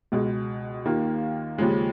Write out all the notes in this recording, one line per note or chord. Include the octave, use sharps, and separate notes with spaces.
C#2 B2 G#3
D#2 D#3 A#3 F4
D#2 C#3 F3 G#3